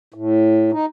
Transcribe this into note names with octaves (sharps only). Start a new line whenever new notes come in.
A2
D#4